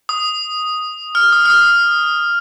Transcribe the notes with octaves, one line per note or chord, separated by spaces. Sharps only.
D#6
F6
D#6
F6
D#6